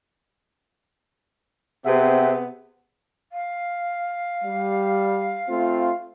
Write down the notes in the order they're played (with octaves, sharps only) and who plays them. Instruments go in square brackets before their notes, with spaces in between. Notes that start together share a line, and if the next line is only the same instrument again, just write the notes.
[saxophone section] C3 B3 G#4 [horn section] C4 E5 F#5
[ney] F5
[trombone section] G3
A3 C4 F4